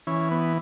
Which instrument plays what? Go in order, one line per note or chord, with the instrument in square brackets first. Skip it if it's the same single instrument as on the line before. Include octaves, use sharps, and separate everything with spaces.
[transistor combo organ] E3 C#4
B3